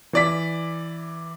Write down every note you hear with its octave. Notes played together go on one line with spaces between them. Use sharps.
E3 D5 B6